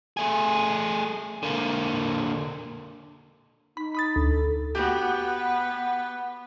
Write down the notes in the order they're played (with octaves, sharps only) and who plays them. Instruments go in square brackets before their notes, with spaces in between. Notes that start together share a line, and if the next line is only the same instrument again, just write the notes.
[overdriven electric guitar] A3 G#4
D3 A#3
[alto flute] D#4 [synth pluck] B5
[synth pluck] B5 D#6 A6
D2
[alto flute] A4
[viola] B3 B4 [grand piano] F#4 G4
[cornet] F#5